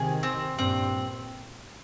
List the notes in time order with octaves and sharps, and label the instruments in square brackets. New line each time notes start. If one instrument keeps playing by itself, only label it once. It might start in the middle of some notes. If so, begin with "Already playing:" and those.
Already playing: [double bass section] C3 D#3 [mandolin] G#4
[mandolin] C4
[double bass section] G2 A#2 [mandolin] C4